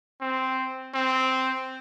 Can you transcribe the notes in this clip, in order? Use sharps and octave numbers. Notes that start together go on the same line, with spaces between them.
C4
C4